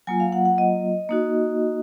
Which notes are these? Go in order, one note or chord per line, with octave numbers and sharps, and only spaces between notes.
F#3 A#3 F4 G#5
F5
F#5
F#5
D#5
A#3 D#4 F#4